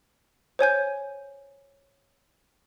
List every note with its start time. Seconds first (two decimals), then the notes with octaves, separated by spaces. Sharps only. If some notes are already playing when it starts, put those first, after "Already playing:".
0.59 C5 C#5 G#5 G6